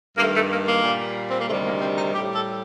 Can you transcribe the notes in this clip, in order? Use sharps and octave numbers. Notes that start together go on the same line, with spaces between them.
G2 D#3 A3 A#3
A3
A#3
A#3
A#2 G3
C4
A#3
D2 C3 D#3 G3 A3
A#3
C4
D#4
A2 G3 G4
A4